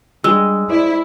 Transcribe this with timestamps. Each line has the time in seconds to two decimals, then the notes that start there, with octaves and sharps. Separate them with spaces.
0.24 G3 G#3 D4 E6
0.70 E4 C5 D5